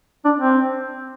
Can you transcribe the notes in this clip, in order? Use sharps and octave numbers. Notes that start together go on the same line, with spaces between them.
D4
C4